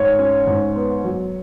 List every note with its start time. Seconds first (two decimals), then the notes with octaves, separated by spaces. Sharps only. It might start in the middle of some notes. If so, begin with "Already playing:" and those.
Already playing: G#2 C#5
0.19 C#4
0.47 G#2
0.76 B3
1.04 F#3